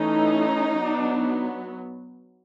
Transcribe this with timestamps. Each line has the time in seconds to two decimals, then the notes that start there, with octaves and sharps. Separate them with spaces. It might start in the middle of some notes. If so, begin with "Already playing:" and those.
Already playing: E3 A3 C#4 D#4
0.79 F#3 B3 D4